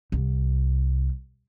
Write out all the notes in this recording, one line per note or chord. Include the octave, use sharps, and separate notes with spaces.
C2